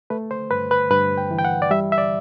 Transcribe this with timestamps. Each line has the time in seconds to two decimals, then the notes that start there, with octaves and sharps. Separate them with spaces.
0.10 A3 B4
0.31 C5
0.51 G2 B4
0.71 B4
0.91 G2 B4
1.18 G5
1.31 E3
1.39 G5
1.45 F#5
1.62 D5
1.71 G3 E5
1.92 E5
1.98 D5